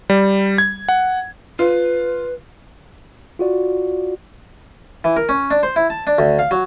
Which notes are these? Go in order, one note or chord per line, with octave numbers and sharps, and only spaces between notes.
G3
G#6
F#5
F4 B4
F4 F#4 D5
E3
A#4
C#4
D4
C5
E4
A5
D4
D2
F5
F#3